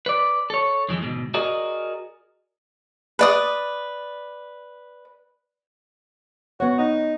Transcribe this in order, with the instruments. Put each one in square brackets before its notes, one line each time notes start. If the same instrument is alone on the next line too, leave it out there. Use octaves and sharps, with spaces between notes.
[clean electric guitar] B4 D5
A4 C#5
F2 E3 F3 G#3
D2 G#2 B2
F#4 G#4 A#4 D5 D#5
[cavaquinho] B4 D5 D#6
[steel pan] B3 C#5 [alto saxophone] F#4
[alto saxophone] D#4